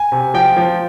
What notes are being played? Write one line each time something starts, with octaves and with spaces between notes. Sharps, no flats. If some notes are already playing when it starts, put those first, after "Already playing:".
Already playing: G#5
C3
F3 G5
F3